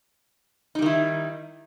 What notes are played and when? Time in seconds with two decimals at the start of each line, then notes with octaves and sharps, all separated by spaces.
0.75 D#4
0.79 G3
0.82 D#3
0.86 E4